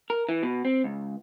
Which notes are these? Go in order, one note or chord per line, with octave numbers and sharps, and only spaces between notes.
A#4
E3
B2
C4
C#2